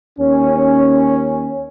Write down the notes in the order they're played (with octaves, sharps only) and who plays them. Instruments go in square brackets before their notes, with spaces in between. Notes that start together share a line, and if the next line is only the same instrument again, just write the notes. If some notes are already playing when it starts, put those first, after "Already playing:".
[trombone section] D#2 C#4